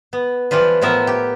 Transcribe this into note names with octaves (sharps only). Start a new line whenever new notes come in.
B3
E3 F3 G3 F4 B4
A2 F3 B3 A#4 E5
G4